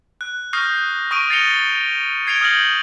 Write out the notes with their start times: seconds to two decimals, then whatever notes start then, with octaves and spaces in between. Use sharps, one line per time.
0.21 F#6
0.53 C#6 D#6 F6 G6 A#6 C7
1.11 C#6 D#6 A#6 D7 D#7
1.30 A6 A#6 C7 C#7 F7 G7
2.27 G#6 C7 D7 F7 G7
2.41 D#6 F6 G6 A#6 F#7